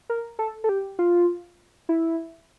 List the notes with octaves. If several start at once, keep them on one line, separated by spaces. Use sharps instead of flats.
A#4
A4
A4
G4
F4
E4